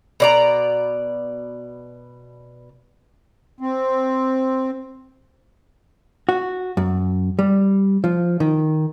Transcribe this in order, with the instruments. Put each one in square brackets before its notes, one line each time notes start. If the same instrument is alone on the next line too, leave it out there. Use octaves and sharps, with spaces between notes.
[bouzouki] B2 D5 A#5
[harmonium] C4
[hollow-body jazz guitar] F#4
F#2
G3
F3
D#3